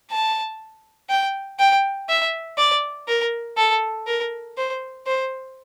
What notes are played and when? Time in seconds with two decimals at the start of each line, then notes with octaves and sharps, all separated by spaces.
0.11 A5
1.10 G5
1.59 G5
2.09 E5
2.58 D5
3.08 A#4
3.57 A4
4.07 A#4
4.57 C5
5.07 C5